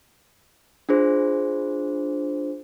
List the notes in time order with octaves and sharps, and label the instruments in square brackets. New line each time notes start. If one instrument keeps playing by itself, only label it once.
[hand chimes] D4 F4 G#4 C5